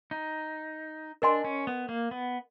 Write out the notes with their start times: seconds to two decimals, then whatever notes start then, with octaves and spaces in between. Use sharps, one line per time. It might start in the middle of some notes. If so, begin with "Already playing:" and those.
0.11 D#4
1.22 D4 A#4 D#5 G#5 C6
1.44 C#4
1.67 B3
1.89 A#3
2.11 B3